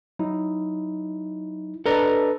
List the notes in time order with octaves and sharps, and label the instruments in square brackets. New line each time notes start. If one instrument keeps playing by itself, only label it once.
[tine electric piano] F#3 D#4 E4
[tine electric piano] D4 D5 D#5 [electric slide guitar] A4 B4 A#5